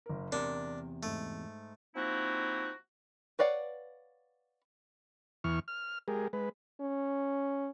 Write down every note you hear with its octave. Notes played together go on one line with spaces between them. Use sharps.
F#1 A#4
E2 C3 D4 A#4
G#2 A3
F3 A#3 C4 D#4 E4 F#4
B4 C#5 D5 F5 F#5
E2 E3 C#6 F6
F6
G#3 G4 G#4 A#4
G#3 B4
C#4